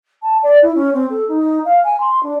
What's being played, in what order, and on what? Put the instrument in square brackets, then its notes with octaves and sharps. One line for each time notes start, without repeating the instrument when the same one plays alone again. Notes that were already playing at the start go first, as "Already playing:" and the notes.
[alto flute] A5
D5
E4
C#4
C4
A4
D#4
F5
G#5
C6
D4